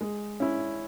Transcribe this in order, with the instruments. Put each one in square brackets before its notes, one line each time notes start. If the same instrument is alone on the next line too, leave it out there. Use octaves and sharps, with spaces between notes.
[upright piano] G#3
C#4 E4